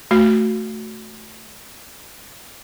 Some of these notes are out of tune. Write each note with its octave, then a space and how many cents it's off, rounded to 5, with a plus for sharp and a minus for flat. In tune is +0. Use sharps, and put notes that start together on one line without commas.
A3 +0 F#4 +0